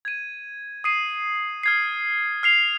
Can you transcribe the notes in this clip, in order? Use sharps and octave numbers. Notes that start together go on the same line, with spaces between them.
G#6 D#7
D#6 C7 D#7
F6 G#6 C7
F6 C7 F7